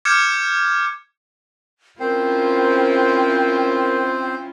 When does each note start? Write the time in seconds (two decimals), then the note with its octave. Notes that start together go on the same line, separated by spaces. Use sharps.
0.05 D6 F6 G6 G#6 C#7 E7
2.00 C4 C#4 E4 F4 A#4 C5 G5